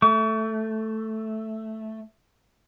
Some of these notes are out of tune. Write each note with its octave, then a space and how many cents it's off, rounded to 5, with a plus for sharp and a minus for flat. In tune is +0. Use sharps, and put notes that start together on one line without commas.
A3 +0 C#6 +35